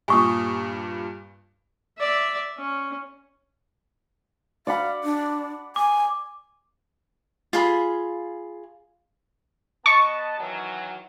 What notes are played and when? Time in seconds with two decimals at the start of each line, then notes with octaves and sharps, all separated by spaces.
0.08 G2 A#2 G#5 C#6 D#6
1.99 D5 E5
2.58 C#4
4.67 D5 F5 F#5 B5
5.04 D4
5.76 G#5 D6
7.53 F4 G#4 B5
9.86 B3 D#5 A5 C#6
10.39 D#3 E3 F#3